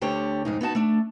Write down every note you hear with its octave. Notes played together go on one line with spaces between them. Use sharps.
D2 D3 G4 C#5
F2 G#2 D#4
B3 D#4 F#4 A5
A3 D4